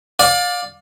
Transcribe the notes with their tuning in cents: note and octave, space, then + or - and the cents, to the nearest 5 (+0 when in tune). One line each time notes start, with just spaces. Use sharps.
D5 +0 F5 +30